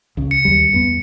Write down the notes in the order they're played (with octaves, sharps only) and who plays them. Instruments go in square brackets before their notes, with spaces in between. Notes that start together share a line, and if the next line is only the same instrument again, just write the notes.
[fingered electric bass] C#2 C#3
[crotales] C#7
[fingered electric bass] D#2 G3
E2 G2 B3